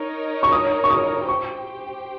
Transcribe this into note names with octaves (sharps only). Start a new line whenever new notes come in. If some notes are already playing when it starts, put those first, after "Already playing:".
Already playing: D#4 A#4 C#5
C#6
D#6
C#6
D#6
G4 C5 G5 C#6